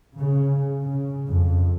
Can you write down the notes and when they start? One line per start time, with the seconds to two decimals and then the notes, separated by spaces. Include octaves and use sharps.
0.18 C#3
0.82 C#3
1.27 F2